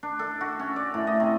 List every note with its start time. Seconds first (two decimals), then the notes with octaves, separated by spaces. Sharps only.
0.03 D4
0.19 A4
0.41 F#4
0.59 C#4
0.76 D5
0.94 A2
1.07 D#5
1.20 C3